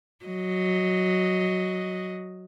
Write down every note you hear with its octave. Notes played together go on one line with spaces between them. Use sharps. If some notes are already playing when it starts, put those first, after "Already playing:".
F#3 D#5